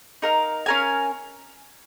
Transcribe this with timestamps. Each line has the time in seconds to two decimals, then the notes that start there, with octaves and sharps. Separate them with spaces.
0.22 D#4 A#4 F5
0.66 C#4 A#4 F5 G#5